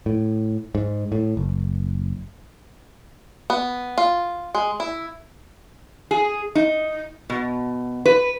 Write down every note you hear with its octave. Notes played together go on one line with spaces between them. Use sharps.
A2
G#2
A2
F#1
B3
F4
G#3
E4
G#4
D#4
B2
B4